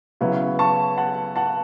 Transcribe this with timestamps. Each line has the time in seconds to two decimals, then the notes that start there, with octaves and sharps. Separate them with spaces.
0.21 C#3 F#3 B3 E4
0.59 A5 C#6
0.97 F#5 A5
1.36 F#5 A5